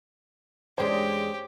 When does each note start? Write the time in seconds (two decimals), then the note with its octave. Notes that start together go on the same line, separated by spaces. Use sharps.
0.78 E2 G#3 C#4 D4 G4 C5 G5